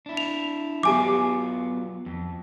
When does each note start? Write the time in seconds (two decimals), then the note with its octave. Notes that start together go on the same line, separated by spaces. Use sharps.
0.06 D4 E4
0.17 F7
0.83 F#3 B3 F4 G4 G#5 D6
2.06 F2